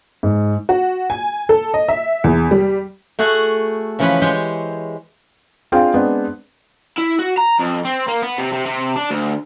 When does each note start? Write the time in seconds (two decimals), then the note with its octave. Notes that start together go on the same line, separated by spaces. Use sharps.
0.23 G#2
0.69 F#4
1.10 G#5
1.49 A4
1.74 D#5
1.89 E5
2.24 E2
2.51 G3
3.19 A3 F#4 G#4 F#5
3.99 C#3 E3 F3 C#4 B4
4.22 G#3 G4 C5 C#5
5.72 C4 D4 F4 G#4 F5 G5
5.94 G#3 B3 C4 D4
6.98 E4
7.19 F#4
7.38 A#5
7.60 F2
7.85 C4
8.08 A#3
8.22 B3
8.38 C3
8.53 C3
8.66 C3
8.96 D4
9.11 D2